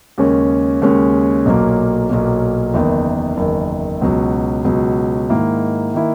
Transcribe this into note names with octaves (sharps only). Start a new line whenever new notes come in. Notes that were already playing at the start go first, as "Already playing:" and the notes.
D#2 C#3 G#3 C#4
D#2 C#3 G#3 C#4
B1 A#2 F#3 A#3
B1 A#2 F#3 A#3
F#1 E2 D#3
F#1 E2 D#3
C#2 B2 F#3
C#2 B2 F#3
G#2 D#3 A#3 E4
D#3 A#3 E4